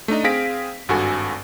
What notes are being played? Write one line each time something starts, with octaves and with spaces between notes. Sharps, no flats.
A3 D4 D#4 D#5
C4 G#4 F5 A#6 B6 D7
G#1 G2 F#4 A4 G#5